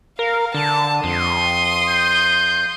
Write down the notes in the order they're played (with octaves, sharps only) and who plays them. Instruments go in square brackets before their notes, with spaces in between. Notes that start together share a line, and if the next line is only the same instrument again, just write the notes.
[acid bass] A#4 [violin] F5
[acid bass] D3 [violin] A5
[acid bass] F2 [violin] C6 D#6
[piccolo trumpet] G6